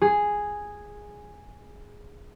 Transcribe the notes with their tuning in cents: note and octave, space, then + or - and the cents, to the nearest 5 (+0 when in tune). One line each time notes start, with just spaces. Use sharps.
G#4 -5